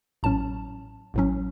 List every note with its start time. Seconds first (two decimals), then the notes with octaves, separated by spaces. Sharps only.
0.23 A1 A2 F#3 C#4 A5
1.14 A1 A2 F#3 C#4